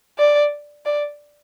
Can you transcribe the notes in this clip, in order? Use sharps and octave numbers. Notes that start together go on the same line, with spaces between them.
D5
D5